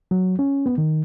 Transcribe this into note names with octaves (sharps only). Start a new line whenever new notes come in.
F#3
C#4
B3
D#3